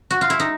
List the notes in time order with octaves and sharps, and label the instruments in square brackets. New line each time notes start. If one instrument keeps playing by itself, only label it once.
[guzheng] F#4
F4
E4
D#4